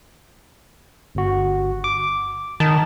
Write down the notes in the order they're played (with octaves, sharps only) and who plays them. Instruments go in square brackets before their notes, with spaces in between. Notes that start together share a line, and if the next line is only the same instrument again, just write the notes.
[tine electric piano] G1 F#4
D6
[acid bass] D#3 [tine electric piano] A5